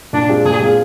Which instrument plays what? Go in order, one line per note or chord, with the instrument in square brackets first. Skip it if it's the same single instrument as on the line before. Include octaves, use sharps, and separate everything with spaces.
[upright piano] A#2 [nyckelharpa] D4
[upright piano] G#3 C4 F4
[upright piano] A#2 [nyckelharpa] G#4
[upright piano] G#3 C4 F4